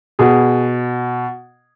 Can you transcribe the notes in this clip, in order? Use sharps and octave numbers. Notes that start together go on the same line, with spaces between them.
B2 G#4